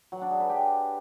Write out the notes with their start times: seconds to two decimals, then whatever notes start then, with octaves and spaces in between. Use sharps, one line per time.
0.12 F#3
0.21 D4
0.31 G#4
0.40 B4
0.50 G4